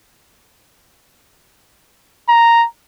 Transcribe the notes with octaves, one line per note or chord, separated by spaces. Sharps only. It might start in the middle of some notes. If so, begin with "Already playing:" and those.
A#5